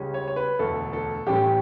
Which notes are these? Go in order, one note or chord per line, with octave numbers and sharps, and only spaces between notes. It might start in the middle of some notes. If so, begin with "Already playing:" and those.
Already playing: C#2 C#3 G3 C#4
C#5
C#5
B4
E1 D2 D3 A3 A4
A4
A1 A2 G3 C#4 G4